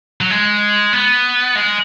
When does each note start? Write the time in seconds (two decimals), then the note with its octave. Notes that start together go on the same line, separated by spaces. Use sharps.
0.21 F#3
0.30 G#3
0.93 B3
1.56 G#3